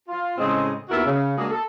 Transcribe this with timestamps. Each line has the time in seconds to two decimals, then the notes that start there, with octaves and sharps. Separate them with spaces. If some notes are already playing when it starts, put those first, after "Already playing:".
0.09 F4
0.38 A2 C#3 G#3 C4 D#5
0.89 D#2 B3 E4 F#4 A#4 E5
1.05 C#3
1.38 G#3 A#3 D4 F#4 G#4
1.50 A4